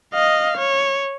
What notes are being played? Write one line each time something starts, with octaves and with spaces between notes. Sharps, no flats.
D#5 F5
C#5